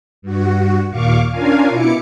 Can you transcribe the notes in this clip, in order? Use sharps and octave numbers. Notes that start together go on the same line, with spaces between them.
G2 F#4
D#2 A#2 F5 C#6 D6
C#4 D4 F4 A#4 F5 G#5
B2 E4 D6 C#7